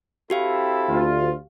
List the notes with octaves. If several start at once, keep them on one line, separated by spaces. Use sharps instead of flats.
C4 E4 F#4 G4 A4 F5
D2 F4